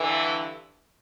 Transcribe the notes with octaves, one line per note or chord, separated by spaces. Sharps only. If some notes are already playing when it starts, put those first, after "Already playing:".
Already playing: G2 D3 E3